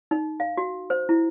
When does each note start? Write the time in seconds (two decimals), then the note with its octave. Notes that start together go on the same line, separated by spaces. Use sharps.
0.11 D#4
0.40 F5
0.57 F#4
0.90 C5
1.09 E4